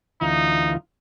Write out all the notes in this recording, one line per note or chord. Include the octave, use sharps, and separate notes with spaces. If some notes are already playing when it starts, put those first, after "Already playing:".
D2 E3 D#4 F4